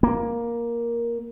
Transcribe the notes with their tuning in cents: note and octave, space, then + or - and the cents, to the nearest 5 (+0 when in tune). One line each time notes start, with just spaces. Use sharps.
A#3 +10